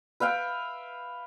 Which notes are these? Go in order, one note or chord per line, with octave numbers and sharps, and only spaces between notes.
B4 E5 F5 G5